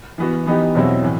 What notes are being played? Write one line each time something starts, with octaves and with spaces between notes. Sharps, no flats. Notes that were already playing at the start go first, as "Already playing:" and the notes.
E3 B3 F#4
E3 B3 D#4 G4
E2 B2 F#3 C4 E4
A2 E3